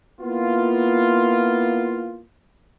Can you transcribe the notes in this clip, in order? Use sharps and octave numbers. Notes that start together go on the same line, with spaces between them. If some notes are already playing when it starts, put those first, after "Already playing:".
A#3 B3 E4 F4